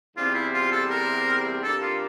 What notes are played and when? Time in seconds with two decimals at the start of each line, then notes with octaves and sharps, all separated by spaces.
0.17 E2 C3 G3 C4 F4
0.35 E4
0.54 F4
0.72 A4
0.90 A#4
1.63 C3 G3 A#3 D4 A4
1.82 F4